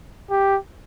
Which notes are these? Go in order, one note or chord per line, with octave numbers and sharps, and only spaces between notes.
G4